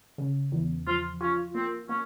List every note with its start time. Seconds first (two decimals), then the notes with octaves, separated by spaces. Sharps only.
0.18 C#3
0.52 E2
0.87 F3 F4
1.21 C#4 F4
1.55 A#3 C4
1.89 A#3 C#4